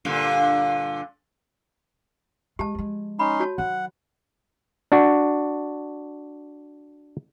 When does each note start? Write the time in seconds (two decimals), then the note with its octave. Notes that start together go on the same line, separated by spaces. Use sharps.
0.05 G2 A#2 D3
2.59 G#3 G4 A5
2.75 F3 G#3
3.19 C#4 D#4 B5 C6
3.40 F#4 C#5 A5
3.58 D#3 F#3 F#5
4.92 D4 F#4